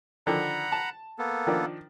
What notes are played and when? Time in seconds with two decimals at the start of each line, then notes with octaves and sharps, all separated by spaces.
0.27 D3 D#3 F3 F#5 A#5 B5
0.72 A5
1.19 A#3 B3 A4
1.47 D#3 F3 D4